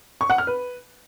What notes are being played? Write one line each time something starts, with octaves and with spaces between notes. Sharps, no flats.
C#6
F#5
F6
B4